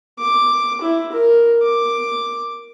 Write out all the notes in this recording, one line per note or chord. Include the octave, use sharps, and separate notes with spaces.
D6
E4
A#4
D6